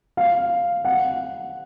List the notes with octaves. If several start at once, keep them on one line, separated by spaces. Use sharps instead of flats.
F5
F#5